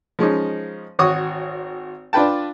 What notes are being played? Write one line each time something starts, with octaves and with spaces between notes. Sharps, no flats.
F3 G#3 C#4 D#4
G#1 F#4 C#5 C#6 D#6
D4 F4 B4 G5 A5